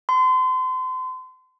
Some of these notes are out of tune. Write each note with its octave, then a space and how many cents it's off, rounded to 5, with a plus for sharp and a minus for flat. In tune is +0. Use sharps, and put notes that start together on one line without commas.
C6 -35